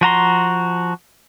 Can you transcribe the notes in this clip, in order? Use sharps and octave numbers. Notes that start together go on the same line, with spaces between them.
F3 F#4 A#5 C6